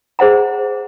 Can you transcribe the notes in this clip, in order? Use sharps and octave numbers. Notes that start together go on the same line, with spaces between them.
G#4 C5 D#5 F#5 A#5